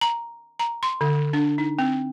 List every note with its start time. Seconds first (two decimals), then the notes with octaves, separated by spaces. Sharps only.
0.01 A#5
0.59 A#5
0.83 C6
1.01 D3
1.33 D4
1.58 D#4
1.79 C4